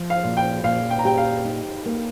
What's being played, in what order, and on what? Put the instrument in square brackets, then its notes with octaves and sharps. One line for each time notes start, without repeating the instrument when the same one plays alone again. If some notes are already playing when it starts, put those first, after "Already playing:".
Already playing: [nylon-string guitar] F3
[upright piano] F5
[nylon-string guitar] A#2
[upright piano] G5
[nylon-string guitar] A#2 [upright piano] F5
[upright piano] G5
A#5
[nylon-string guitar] G4 [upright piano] G5
[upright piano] F5
[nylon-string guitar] D#4
A#3